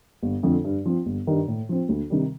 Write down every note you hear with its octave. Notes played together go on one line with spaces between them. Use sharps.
G1
F2 D3 F3 A3
G2
F3 C4
G1
G2 D#3 G3
A2
F3 C4
D2
C3 D#3 G3